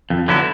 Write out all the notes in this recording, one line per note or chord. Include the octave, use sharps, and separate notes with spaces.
F2
D3 F#3 B3 E4